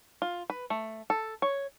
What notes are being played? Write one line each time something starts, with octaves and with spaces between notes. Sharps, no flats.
F4
B4
A3
A4
C#5